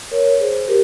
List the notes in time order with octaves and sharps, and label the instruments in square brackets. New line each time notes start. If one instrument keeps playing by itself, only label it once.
[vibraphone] A#4 C#5
G#4 C5
G4 A#4